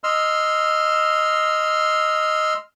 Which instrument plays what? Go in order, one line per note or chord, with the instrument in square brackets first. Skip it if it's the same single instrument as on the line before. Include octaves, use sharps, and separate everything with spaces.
[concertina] D#5 C6 E6 F6